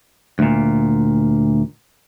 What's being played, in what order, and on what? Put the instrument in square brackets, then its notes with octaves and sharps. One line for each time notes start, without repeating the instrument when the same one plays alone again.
[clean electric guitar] D2 A#2